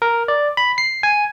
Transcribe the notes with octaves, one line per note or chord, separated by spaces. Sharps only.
A#4
D5
B5
C7
G#5